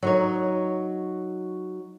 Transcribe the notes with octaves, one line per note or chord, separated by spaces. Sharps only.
F#3 D#4 C#5